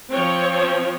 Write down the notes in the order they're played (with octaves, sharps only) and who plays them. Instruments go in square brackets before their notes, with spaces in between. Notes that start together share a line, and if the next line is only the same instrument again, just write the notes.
[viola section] F3 C4 C#5